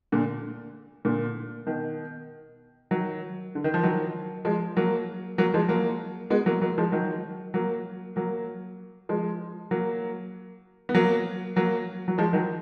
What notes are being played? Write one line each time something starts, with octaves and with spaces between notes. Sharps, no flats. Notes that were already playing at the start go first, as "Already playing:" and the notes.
A#2 D3
A#2 D3
B2 D#3
D#3 F#3
D3
D#3
F3
D#3 F#3
F3 G#3
F#3 A#3
F#3 A#3
F3 G#3
F#3 A#3
G#3 B3
F#3 A#3
F#3 A#3
F3 G#3
D#3 F#3
F#3 A#3
F#3 A#3
F3 G#3
F#3 A#3
B3
F#3 A#3
F#3 A#3
F#3
F3 G#3
D#3 F#3